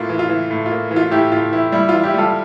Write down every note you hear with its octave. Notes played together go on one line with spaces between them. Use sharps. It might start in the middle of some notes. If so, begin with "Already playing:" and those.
Already playing: A2 A#3 F4
E3
F4
E3
A2
F4
A#3
E3
F4
A2 E4 G4
A2 F4
E3 E4
G3 E4
E3 F4
E4 G4
G3 F4 A4